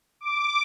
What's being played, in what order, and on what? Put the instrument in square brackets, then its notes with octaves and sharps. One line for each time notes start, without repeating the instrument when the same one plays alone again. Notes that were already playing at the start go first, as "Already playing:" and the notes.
[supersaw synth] D6